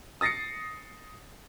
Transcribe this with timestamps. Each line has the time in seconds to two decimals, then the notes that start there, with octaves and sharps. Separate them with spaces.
0.21 D#6 A6 A#6 C7 C#7